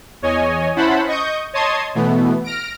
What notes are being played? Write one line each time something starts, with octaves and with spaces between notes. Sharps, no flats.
E2 C#5 D#5 G#5
C#4 E4 C5 F#5 A5 B5
D#5 C#6 D#6 G6
C#5 D#5 A5 C6 D#6 G#6
B2 E3 A3 B3
F6 A#6 D7